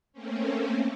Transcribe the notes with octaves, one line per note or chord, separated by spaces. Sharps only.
A3 A#3 C4 C#4